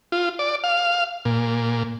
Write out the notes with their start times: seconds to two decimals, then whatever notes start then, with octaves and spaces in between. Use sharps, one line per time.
0.12 F4
0.39 D5
0.64 F5
1.25 A#2